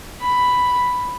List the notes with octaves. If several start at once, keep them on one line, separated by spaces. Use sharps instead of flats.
B5